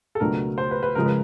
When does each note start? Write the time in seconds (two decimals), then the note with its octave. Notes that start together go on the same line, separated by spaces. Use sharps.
0.15 A4
0.20 C#2 B2 F#3 A3 D4 A#4
0.58 C5
0.71 B4
0.83 B4
0.95 C#3 F3 G#3 A#4
1.06 B4